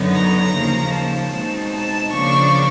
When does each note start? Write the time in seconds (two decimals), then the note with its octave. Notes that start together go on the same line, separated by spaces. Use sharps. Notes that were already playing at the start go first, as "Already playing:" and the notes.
Already playing: F#2 D3 F#3 B3 D#4
0.15 A#5
0.55 D#2 C#3 F3 A#3
0.94 A5
1.34 B2 G#3 C4 D#4
1.74 A5
2.13 C#3 F3 A#3 D4 C#6